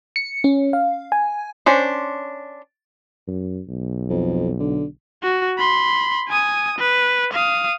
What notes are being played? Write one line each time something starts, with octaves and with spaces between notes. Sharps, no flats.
C#7
C#4
F5
G#5
C#4 D4 C5
F#2
B1
F2
D3
F#4
B5 C6
G#5 D#6
B4
F5 D#6